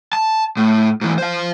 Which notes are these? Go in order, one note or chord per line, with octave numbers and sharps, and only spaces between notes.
A5
A2
G#2 E3
C5 F5